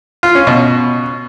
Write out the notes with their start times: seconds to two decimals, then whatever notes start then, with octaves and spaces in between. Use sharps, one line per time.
0.23 F4
0.35 C#4
0.47 B2